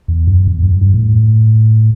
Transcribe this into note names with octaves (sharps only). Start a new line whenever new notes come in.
E2
F#2
E2
G2
F#2
G2
A2